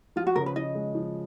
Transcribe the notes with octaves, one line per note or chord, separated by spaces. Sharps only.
F3 F4
F#4
C#3 A#4
B4
F3 D#5
G#3
F3